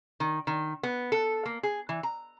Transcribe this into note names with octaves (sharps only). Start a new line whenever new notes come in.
D#3
D#3
B3
A4
A#3
G#4
E3
A#5